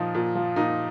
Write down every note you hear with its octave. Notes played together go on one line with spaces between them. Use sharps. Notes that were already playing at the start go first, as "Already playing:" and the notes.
Already playing: A#2 F3 D#4
A#2
F3
A#2 D#4